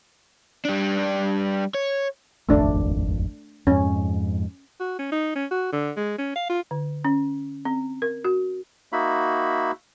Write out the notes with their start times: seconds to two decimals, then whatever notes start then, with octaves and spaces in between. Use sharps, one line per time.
0.65 G3 D4
1.74 C#5
2.49 D#1 G#1 F2 A3 D4 D5
3.67 F2 G#2 C#4
4.80 F#4
4.99 C#4
5.12 D#4
5.35 C#4
5.51 F#4
5.72 D3
5.96 G#3
6.18 C#4
6.35 F5
6.49 F4
6.71 D3
7.05 C#4
7.65 C4
8.02 A#4
8.24 F#4
8.93 A#3 D#4 F#4 E5 B5